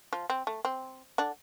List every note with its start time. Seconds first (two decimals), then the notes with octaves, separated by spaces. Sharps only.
0.13 F3 F4
0.30 C4
0.47 A3
0.65 C4
1.18 D3 D4